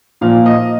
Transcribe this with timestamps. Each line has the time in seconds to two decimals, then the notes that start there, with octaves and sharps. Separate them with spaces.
0.21 A#2 F3 A#3 F5
0.46 D#5